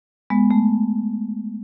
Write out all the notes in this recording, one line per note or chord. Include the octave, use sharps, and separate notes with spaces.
G#3 B3
A3